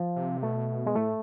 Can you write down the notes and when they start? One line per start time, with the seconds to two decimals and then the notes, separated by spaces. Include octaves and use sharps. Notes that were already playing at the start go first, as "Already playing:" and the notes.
Already playing: F3
0.16 C3
0.42 B2 A3
0.87 G#3
0.95 A2 A3